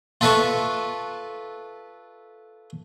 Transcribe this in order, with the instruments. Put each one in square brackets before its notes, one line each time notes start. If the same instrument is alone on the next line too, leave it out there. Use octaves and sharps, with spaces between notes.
[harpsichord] F4 A4 B4 E5 A5 C#6